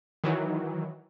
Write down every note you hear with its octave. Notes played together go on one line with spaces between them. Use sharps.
D#3 E3 F#3